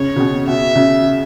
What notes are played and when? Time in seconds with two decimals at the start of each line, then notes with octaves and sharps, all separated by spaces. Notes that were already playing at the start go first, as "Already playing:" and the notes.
Already playing: C#3 C#5
0.16 C#3
0.20 B2
0.47 B2 E5
0.75 C#3